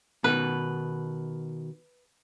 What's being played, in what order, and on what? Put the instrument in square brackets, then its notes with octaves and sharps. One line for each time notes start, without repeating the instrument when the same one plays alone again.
[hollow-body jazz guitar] B2 D#3 [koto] B4